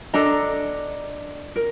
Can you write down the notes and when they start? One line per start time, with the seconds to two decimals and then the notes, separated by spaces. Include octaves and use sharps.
0.13 D4 A4 D#5 A#5
1.56 A#4